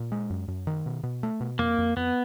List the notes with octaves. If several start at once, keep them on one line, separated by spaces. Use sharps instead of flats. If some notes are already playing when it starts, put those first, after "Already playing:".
Already playing: A#2
G#3
F#2
F#2
D#3
B2
B2
A3
B2
F2 A#3
F2
F2 B3